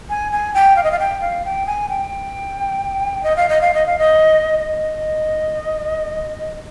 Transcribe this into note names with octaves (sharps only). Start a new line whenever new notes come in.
G#5
G#5
G5
F5
D#5
F5
G5
F5
G5
G#5
G5
D#5
F5
D#5
F5
D#5
F5
D#5
D#5